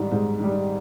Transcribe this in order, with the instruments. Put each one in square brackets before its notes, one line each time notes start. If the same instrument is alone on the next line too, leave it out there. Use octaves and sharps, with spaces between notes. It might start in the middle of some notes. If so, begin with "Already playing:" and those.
Already playing: [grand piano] G#2 D#3 G3
G#2
D#3 G3